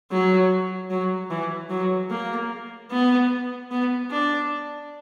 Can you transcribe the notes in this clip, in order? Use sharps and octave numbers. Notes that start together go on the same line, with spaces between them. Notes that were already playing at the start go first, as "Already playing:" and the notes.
F#3
F#3
E3
F#3
A#3
B3
B3
D4